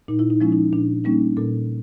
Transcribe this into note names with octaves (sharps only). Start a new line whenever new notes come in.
A#2 D#4
E4
D#4
F3 G#3 C#4 E4
D#4
A#2 D4
G3 A#3 C#4 D#4
A#2 A4